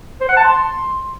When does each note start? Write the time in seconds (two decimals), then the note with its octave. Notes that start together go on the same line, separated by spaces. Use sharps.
0.21 C5
0.29 F#5
0.36 A5
0.44 C6